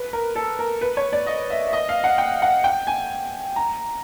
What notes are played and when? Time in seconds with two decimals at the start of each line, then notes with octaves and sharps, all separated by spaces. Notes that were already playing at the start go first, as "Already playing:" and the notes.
Already playing: B4
0.13 A#4
0.35 A4
0.59 A#4
0.81 B4
0.97 C#5
1.13 D5
1.27 D#5
1.50 E5
1.67 E5
1.73 D#5
1.89 F5
2.04 F#5
2.18 G5
2.42 F#5
2.64 G5
2.87 G#5
3.56 A#5